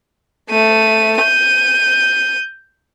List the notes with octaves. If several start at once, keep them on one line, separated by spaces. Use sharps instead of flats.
A3 D#7
G6 D#7